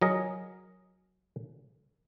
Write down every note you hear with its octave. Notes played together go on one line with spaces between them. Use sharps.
F#3 G#4 A#4 D#5